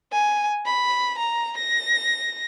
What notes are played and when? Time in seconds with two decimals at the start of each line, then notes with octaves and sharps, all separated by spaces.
0.12 G#5
0.66 B5
1.18 A#5
1.57 A#6